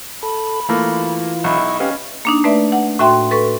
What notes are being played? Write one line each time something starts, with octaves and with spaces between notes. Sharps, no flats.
A4 B5
E3 A3 A#3 F4
B1 E4 D#5 C#6
C#4 G4 B4 F5
A#3 D4 D#4
A3 B4 D5 E5
F#5
A2 F#4 E5 G5 C6
A4 B4 C#6